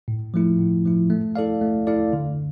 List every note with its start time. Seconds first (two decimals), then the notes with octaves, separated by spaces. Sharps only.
0.08 A2
0.34 F3 A3 E4
0.59 A2
0.85 F3 A3 E4
1.10 A3
1.36 E4 A4 D5 F5
1.61 A3
1.87 E4 A4 D5 F5
2.13 D3